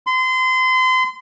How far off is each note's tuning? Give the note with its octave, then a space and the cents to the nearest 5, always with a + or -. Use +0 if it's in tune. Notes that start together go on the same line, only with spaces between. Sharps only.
C6 -30